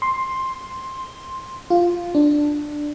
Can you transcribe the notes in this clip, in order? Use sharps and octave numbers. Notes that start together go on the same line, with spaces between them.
C6
F4
D4